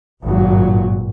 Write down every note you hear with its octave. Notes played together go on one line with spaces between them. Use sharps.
G#1 G2 A#2 F#3